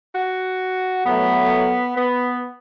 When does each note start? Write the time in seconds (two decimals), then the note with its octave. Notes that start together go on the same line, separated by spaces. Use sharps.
0.15 F#4
1.05 A2 F#3 A3 B3
1.96 B3